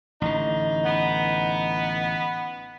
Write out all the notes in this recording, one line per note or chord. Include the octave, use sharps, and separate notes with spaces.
A1 D3 D#4
B3